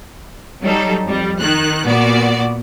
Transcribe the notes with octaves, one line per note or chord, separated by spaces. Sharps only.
F#3 G3 D#4 A4
F2 G3
D#3 F#6
A#2 B3 F#4 D5